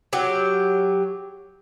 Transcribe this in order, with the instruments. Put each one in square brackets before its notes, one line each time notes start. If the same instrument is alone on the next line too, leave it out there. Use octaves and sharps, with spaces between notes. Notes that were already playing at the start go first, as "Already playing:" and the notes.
[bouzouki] F#3 G4